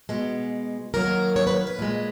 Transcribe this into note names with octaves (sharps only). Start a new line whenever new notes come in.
B2 G#3
D#3 F#3 A#3 A#4
C#5
B4
A#4
B4
A#2 G#3